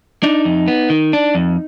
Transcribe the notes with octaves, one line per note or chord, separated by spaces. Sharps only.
D4 D#4
F2
B3
D#3
D4
F2